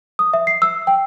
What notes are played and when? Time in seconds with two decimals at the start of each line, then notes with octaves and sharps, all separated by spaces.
0.19 D#6
0.34 E5
0.47 C7
0.62 E6
0.87 G5